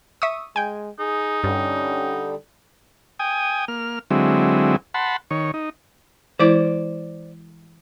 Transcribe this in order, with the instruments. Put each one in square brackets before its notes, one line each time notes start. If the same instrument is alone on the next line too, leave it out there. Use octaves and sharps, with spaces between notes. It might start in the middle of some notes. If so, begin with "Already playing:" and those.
[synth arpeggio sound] E5 C#6 D#6
[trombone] G#3 [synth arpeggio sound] G5 G#5
[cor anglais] D#4 [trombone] G#4
[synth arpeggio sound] G2 [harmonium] D3 G3 [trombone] C#4
[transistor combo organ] G5 G#5 D#6
A#3 F6
D3 F#3 G#3 C4 E4
F#5 A5 B5 C6
D#3 C#5
D#4
[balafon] E3 G#3 E4 [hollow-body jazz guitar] C5 D5